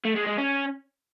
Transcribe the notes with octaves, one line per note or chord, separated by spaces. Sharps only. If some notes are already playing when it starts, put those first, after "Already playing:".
A3
G#3
G#3
C#4